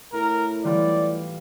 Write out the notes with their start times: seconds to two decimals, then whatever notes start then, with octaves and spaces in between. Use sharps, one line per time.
0.13 A2 A#4
0.64 E3 G3 F4 D5